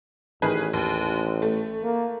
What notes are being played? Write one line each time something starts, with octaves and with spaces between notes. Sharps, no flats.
A1 D#3 G#4 B4
D#2
A3
A#3